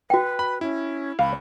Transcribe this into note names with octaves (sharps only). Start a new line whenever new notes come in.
F#4 B4 G5
B5
C#4 E4
C#2 F5 B5